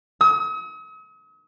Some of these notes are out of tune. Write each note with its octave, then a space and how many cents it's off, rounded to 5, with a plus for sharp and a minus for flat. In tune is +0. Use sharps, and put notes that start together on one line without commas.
D#6 +45